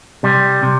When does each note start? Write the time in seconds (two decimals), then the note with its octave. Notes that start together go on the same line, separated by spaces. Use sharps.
0.23 C3 G3
0.63 C3